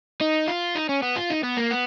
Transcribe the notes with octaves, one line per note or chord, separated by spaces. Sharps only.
D#4
F4
D#4
C#4
B3
F4
D#4
B3
A#3
B3